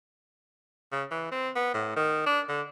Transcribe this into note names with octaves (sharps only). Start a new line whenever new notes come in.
C#3
E3
C4
B3
A2
D#3
D4
D3